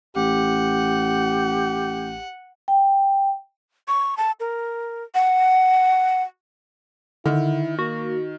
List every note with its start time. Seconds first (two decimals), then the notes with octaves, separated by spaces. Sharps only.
0.16 A1 G4 F#5
2.68 G5
3.88 C#6
4.17 A5
4.40 A#4
5.15 F#5
7.26 D3 D#3 E4
7.79 A#3 F#4